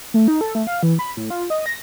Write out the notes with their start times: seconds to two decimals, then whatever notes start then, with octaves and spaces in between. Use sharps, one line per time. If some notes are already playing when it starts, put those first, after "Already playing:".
0.14 A3
0.28 D#4
0.41 A4
0.55 A3
0.67 F5
0.83 E3
0.99 B5
1.17 A2
1.30 F4
1.50 D#5
1.66 A#6